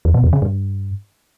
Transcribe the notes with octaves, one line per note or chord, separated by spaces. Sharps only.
E2
B2
E2
C#3
G2